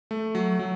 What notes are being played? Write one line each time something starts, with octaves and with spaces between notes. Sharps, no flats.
A3
F#3
F#3